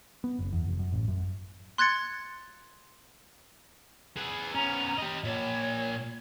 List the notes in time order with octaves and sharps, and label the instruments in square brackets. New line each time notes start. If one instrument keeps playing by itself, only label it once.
[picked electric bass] B3
F#1
E2
F1
F#2
A1
F#2
[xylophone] C6 F#6 G#6 A6 C#7
[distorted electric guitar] G#4 B4
[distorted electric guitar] B3 C#4 [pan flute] A#5
[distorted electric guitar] G4 D#5
[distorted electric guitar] A#2 A5 [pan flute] C#5